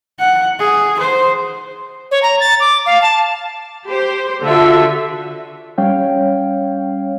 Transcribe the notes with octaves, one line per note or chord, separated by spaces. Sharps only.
F#5
G#4
C5
C#5
A#5
A6
D6
F5
A5
G4 C5
D3 F4 F#4 A4 E5
G3 C#4 C#5 F5 G5